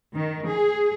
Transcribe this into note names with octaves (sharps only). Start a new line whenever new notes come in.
D#3
G#4